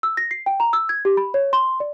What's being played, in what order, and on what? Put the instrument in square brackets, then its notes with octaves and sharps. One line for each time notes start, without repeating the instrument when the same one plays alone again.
[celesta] E6
A#6
C7
G5
A#5
E6
G#6
G4
B5
C#5
C6
D5